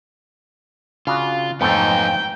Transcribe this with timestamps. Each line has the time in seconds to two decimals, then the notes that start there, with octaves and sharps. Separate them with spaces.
1.07 C#3 D4 F4 F#4
1.61 F2 G#2 A3 B3 D#4 G5